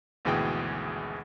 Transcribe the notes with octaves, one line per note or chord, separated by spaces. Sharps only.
G#1 D2 B2 E3 G#4 G5